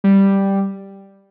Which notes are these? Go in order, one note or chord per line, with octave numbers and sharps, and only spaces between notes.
G3